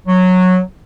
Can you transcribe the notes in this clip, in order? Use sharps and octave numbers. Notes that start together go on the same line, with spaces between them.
F#3